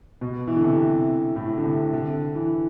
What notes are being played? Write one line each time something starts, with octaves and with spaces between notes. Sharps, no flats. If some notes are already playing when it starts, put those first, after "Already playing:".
B2
E3
D3
C3
A2
D3
C3
D3
E3